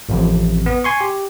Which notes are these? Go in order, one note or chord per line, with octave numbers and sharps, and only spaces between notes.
A1 F2 C3
B3
G#5 C6 C#6
G4